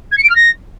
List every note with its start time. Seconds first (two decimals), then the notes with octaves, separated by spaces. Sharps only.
0.11 G#6
0.17 C#7
0.23 D7
0.29 F6
0.35 A#6